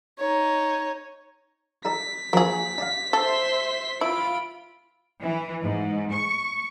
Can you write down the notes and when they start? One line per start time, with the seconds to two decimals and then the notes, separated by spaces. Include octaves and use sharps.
0.19 D#4 C#5
1.85 D#4 A4 D5 B6
2.33 F3 F#3 A#3 D4 G#4
2.78 D4 D5 F5
3.13 A4 C5 E5 C6
4.01 E4 F4 B5 D7
5.22 E3
5.64 G#2
6.14 C#6